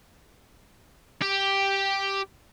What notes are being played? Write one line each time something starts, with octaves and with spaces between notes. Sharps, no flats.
G4